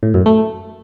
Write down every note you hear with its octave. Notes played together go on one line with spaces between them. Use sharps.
A2
F#2
A3